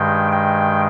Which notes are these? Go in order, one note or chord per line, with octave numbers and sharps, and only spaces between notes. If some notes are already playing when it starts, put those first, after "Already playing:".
Already playing: G2 D#3 G#3 G5
G5